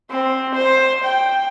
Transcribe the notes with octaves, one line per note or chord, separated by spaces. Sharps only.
C4
C5
G5